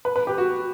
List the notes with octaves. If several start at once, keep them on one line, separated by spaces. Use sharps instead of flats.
B4
B4
G4
F#4